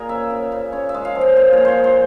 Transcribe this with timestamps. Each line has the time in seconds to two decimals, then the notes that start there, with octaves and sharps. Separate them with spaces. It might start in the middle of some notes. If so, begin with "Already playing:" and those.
Already playing: A#2 G#4 A#4
0.09 C#3 E5
0.30 C#3
0.52 C#3
0.73 C#3 C#5
0.89 E5
0.94 G#3
1.05 F5
1.15 F3
1.21 F5
1.36 A#2 F5
1.53 A#2 C#5
1.65 C5 C#5
1.79 G#3
1.84 C5